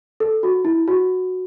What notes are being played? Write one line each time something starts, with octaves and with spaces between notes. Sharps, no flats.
A4
F#4
E4
F#4